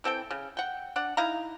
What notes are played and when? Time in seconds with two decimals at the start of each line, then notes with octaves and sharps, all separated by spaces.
0.04 E3 C4 A4 G5
0.31 C#3
0.57 F#5 G5
0.96 D4 F#5
1.17 D#4 E4 F5 A#5